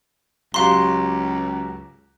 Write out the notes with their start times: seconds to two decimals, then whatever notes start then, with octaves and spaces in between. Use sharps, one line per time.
0.54 C#2 F#3 F#4 G4 F5 A#5 C6